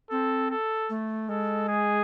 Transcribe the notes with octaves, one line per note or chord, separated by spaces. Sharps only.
C4 A4
A4
A3
G#3 A4
G#4